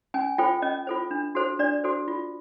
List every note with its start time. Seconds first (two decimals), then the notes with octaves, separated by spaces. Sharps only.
0.14 C#4 G#5
0.38 F4 A4 C5 G5
0.62 C#4 D#5
0.87 F4 A4 C5
1.11 D4
1.35 F#4 A4 C5
1.59 D4 D5
1.84 F#4 A4 C5
2.08 F4